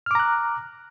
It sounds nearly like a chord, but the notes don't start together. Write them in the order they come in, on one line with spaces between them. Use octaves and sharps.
F6 D6 A#5 F#6